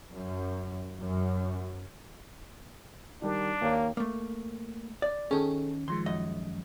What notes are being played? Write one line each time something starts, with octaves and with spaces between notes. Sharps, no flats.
F#2
F#2
D#3 G3 D4 A#4
D#2 A#3 C#5
A3 A#3
D5
D#3 C#4 G#4 A4
D#3 F3 G#3 C6
F#2 D#5